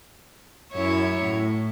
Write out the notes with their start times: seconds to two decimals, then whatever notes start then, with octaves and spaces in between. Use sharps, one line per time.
0.73 F#2 E4 C#5
1.24 A2